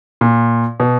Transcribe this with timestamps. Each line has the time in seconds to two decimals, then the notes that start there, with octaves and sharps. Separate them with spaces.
0.21 A#2
0.80 B2